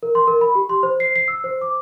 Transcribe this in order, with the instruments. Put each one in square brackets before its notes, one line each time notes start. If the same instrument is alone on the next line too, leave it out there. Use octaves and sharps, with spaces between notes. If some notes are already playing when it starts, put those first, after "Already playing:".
[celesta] A#4
C6
A#4
B5
G4
C6
C5
C7
C7
E6
C5
D6